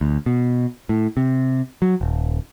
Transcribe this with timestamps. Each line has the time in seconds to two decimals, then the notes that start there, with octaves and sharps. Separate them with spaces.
0.01 D2
0.26 B2
0.89 A2
1.17 C3
1.82 F#3
2.01 D#1